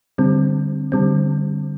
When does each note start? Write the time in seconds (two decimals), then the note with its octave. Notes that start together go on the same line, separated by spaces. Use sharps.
0.18 D3 G3 C4
0.92 D3 G3 C4